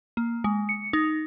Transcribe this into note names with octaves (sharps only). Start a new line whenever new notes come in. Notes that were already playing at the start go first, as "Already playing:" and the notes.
A#3
G#3
C#7
D#4